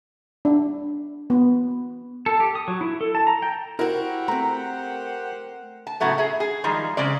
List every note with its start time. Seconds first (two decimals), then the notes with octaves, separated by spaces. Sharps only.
0.45 D4
1.30 B3
2.26 A4
2.40 G4
2.55 D#6
2.68 F#3
2.81 E4
3.01 A4
3.15 A5
3.27 A#5
3.42 G5
3.79 E4 F#4 G4 A#4 C5 F#5
4.28 A3 C4 A#5
5.87 A5
6.00 A2 C#3 F#3 A3 B3
6.18 G#4 E5
6.40 G#4
6.64 D#3 F3 G3 G#3
6.97 C#3 G#3 C4 D5